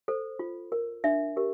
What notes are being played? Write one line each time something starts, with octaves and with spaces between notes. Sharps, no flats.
A4 C5
F4
A#4
D4 E5
G4 A#4